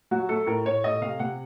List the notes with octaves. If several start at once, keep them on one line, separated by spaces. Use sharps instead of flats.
F#3 F#4
A3 A4
A2 A#4
A2 C#5
A3 D#5
C3 F5
C3 F#5